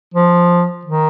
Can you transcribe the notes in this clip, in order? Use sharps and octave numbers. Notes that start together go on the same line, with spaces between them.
F3
D#3